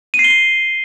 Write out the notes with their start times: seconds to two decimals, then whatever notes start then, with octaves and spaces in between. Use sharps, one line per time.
0.14 D#7
0.19 C7
0.24 G7